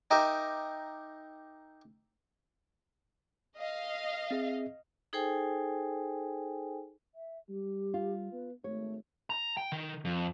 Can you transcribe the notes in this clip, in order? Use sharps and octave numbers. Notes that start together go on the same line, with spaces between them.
D#4 G4 A#4 D#5 E5
D#5 F5
C4 G#4 E5
D#4 G#4 A4 C5 G5 G#5
E5
G3 G4
F4
B3 B4
G#1 A3 C#5
A#5
G5
D#3
F2